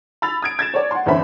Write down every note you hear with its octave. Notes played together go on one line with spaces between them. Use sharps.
B5 E6 A6 F7
D#6 G#6 D7
G#6 A6 E7
C#5 D5
F#5 C6
G1 E2 C#4 C5 E5 B5